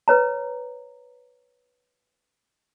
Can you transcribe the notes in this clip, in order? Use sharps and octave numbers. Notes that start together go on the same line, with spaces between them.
B4 C#5 A#5